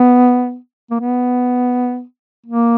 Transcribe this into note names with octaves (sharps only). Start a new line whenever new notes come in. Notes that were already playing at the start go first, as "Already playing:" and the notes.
Already playing: B3
A#3
B3
A#3